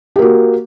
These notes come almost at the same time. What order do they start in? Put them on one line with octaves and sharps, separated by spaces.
G4 A#3 F#4